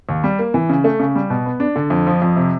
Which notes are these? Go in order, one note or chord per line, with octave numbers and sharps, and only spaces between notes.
D#2
G3
A#3
E3
C#3
A3
C#3
G3
B2
B3
D4
D3
F2
F3
F2
C3